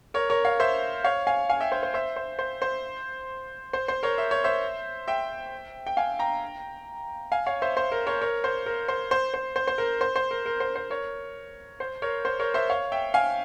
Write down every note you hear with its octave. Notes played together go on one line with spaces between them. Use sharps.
A#4 C#5
A#4 C#5
C#5 F5
C5 E5
C#5 F5
F5 G#5
F5 G#5
E5 G5
C5
C5
C5 E5
C5
C5
C5
C5
C5
A#4 C#5
E5
C#5
C5 E5
E5 G5
G5
F5 G#5
G5 A#5
F5 G#5
C#5 F5
C5 E5
C5
A#4
A#4 C#5
A#4 C#5
C5
A#4
C5
C5
C5
C5
C5
A#4
C5
C5
A#4
A#4
C5
C5
A#4 C#5
C5
A#4 C#5
C5
A#4 C#5
C5 E5
C#5 F5
E5 G5
F5 G#5